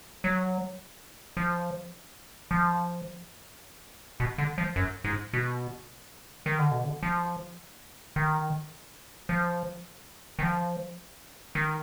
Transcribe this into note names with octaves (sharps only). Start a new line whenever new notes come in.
F#3
F3
F3
B2
D3
F3
F#2
G#2
B2
D#3
D3
B2
D3
F3
D#3
F3
D#3
F3
D#3